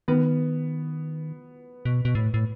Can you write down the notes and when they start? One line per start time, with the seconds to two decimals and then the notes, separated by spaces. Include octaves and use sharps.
0.08 D#3 B3
1.85 B2
2.05 B2
2.15 A2
2.34 A2